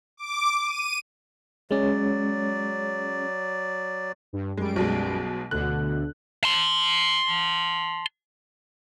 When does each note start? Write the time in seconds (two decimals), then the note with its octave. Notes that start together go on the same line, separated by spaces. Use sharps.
0.17 D6
0.65 D#7
1.71 F#3 G#3 C#4 D5
4.33 G2
4.57 F#2 G3 G#3 D7
4.76 B1 B2 G#3
5.51 D2 B2 D3 F#6
6.44 A5 C6